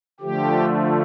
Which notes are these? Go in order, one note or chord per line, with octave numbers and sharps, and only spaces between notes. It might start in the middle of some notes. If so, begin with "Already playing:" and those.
D3 F3 A3 G4